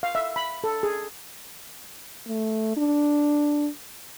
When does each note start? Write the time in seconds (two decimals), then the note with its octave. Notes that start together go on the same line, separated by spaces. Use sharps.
0.03 F5
0.15 E5
0.36 B5
0.64 A4
0.83 G#4
2.28 A3
2.77 D4